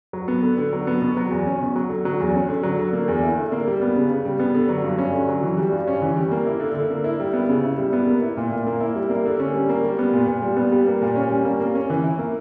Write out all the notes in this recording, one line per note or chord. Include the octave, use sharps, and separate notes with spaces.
F#3
B3
D3
D3
F#3
B3
B2
F#3
E2
C#4
B2
F#3
D3
F#3
E2
C#4
D3
F#3
D3
A#3
E2
E4
D3
A#3
G3
B3
C#3
C#3
G3
B3
D3
F#3
G2
C#4
D3
F#3
E3
G3
G2
C#4
E3
G3
A#3
E4
D3
D3
A#3
E4
G3
B3
C#3
E4
G3
B3
A#3
E4
A#2
A#2
A#3
E4
G3
A#3
D3
C#4
G3
A#3
G3
B3
A#2
A#2
G3
B3
G3
A#3
A#2
C#4
G3
A#3
A#3
C#4
E3
E4
A#3